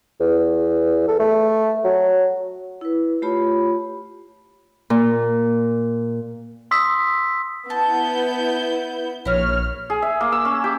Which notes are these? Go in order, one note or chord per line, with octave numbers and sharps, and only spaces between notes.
E2
A4
A3
F#3
E4 B4
A3 F4 G4 C#5 B5
A#2
C6 D#6 E6 B6
B3 E4 A5 G6
A#1 E4 F#4 C#5 F6
G#4
E5
A#3
E6
C#4
G4